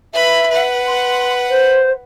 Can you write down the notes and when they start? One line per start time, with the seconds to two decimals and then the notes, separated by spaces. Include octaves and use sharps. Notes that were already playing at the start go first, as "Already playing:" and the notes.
0.13 B4 E5 B5
0.50 B4 F#5
0.87 C6
1.49 C5